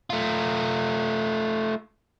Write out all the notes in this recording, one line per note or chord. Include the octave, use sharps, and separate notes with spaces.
A3 F4